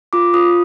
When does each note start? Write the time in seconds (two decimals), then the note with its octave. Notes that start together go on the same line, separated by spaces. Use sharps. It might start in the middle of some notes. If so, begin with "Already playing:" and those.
0.13 F4 D6
0.34 F4 D#6